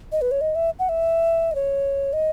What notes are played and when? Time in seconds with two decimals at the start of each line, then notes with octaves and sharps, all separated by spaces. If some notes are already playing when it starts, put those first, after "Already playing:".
0.12 D#5
0.21 B4
0.31 C#5
0.41 D#5
0.55 E5
0.79 F#5
0.89 E5
1.51 D#5
1.55 C#5
2.13 D#5